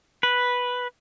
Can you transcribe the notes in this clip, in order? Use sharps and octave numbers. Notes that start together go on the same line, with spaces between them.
B4